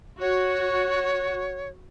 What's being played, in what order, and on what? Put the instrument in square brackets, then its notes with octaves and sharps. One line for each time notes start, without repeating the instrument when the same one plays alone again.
[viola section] F#4 [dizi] C#5